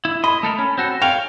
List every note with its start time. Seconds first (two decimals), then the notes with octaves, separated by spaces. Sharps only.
0.05 E4
0.24 D#5 B5
0.43 A3 A4 A#4
0.58 C#4
0.78 C4 F#4 A4
1.02 C#5 F5 G5